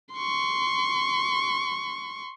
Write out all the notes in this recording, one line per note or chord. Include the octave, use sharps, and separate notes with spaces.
C6 C#6